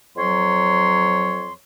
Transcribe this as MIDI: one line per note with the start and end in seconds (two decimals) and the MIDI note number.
0.16 1.52 41
0.16 1.52 54
0.16 1.52 73
0.16 1.52 84